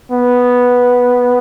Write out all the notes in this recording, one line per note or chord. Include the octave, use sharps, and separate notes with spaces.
B3